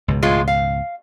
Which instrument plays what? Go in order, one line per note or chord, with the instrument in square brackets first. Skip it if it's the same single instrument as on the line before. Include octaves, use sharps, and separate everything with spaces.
[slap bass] C#2 G#2 B2
[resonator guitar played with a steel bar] A2 G#3 F4
F5